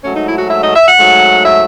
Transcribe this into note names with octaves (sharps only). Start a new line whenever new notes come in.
G#2 F#3 A3 C#4
D#4
E4
F#4
E5
D#5
E5
F#5
G#2 F#3 A3
E5